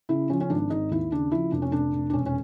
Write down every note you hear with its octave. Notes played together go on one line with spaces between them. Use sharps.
C#3 E4
F3 C#4
C#4
G#1 D4
G#1 D#4
D#2 E4
C#3 D4
F3 E4
F1 D4
C#4
F1 D4
F1
D4
E1 C#4
C#4